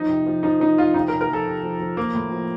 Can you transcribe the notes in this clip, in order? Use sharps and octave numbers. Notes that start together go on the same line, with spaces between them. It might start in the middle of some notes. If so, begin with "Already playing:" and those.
Already playing: F3 D#4
C3
F3
F3 D#4
F3 D#4
F3 F4
C3 D#4
A#4
C3
A#4
F3 A4
C3
F3
F3
F3 A#3
A2
F3